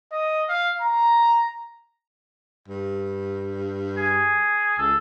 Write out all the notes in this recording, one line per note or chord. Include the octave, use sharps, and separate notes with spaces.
D#5
F5
A#5
G2
G#4
C#2 A4